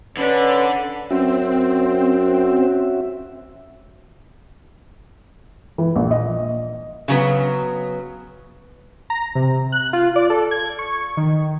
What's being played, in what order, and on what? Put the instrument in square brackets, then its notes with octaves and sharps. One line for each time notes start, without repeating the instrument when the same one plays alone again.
[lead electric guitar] D3 D4 [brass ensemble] C#4 B4
[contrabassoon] F#2 [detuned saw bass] C4 [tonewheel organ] C#4 F#4 E5
[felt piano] E3
A#1
D#5
[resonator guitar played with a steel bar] C#3 F#3 B3
[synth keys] A#5
C3
F#6
F4
D5
A4
G#6
C#6
D#3